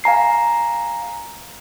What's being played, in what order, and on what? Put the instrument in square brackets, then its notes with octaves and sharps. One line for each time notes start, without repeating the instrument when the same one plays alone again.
[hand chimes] F5 G#5 A#5 C7